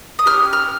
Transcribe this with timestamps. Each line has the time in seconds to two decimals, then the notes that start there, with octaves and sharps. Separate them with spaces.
0.19 D#6
0.26 C#4 G4 F6
0.53 F6